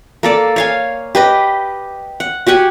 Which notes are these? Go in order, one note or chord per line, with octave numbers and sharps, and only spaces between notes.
A#3 A4 D5
C#5 F5 G#5
G4 B4 D#5
F#5
F#4 G4 F#5 G#5